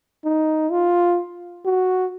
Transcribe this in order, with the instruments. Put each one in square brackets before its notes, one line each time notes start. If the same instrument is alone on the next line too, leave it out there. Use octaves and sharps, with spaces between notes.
[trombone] D#4
F4
F#4